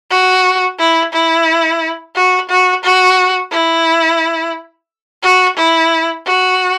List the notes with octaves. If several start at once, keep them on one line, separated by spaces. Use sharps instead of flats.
F#4
E4
E4
F#4
F#4
F#4
E4
F#4
E4
F#4